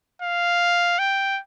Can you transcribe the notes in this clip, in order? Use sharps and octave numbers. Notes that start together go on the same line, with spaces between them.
F5
G5